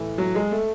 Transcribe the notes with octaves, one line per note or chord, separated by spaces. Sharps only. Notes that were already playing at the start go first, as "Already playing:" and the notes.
Already playing: A2 E3
F#3
G#3
A3